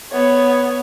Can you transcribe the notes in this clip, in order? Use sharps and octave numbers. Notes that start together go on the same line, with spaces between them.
B3 C#5